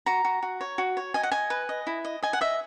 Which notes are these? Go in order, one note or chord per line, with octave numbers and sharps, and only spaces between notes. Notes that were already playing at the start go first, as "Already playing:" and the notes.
F#4 A#5
F#4
F#4
C#5
F#4
C#5
D#5 G#5
F#5
D#5 G#5
B4
D#5
E4
D#5
D#5 G#5
F#5
D#5 E5